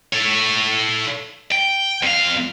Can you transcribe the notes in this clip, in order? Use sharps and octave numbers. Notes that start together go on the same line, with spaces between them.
A4 C#5
G5
F2 F5